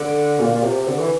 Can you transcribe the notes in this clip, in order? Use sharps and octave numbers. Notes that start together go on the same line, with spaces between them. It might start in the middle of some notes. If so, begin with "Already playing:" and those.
Already playing: D3
A#2
A#2
C3
D3
E3